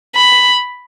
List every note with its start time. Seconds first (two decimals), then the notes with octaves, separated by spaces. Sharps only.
0.15 B5